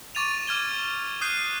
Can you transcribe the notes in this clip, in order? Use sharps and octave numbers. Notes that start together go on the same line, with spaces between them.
C#6 D6 A6 D#7 F7
D6 F6 G#6 G7
D#6 F#6 G6 C7 D#7